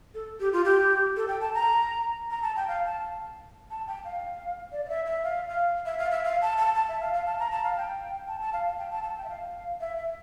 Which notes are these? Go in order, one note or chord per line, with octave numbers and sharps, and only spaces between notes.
A4
G4
F4
G4
A4
G5
A5
A#5
A#5
A5
G5
F5
A5
A5
G5
F5
D5
D5
E5
E5
F5
F5
E5
F5
E5
F5
A5
A5
A5
E5
F5
F5
A5
A#5
A5
F5
G5
A5
A5
F5
F5
G5
A5
A5
G5
E5
F5
E5
E5